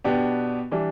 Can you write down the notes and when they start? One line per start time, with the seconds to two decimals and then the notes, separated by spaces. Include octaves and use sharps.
0.04 B2 B3 D4 G4
0.71 E3 G3 D4